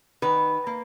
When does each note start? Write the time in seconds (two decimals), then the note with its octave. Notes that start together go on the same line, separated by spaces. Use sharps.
0.22 D#3 B4
0.67 A#3